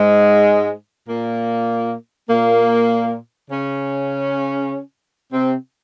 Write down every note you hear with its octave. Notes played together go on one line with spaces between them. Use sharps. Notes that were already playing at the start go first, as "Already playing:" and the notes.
Already playing: G#2 G#3
A#2 A#3
A#2 A#3
C#3 C#4
C3 C4